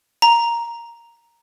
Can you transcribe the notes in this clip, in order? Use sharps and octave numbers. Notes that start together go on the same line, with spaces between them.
A#5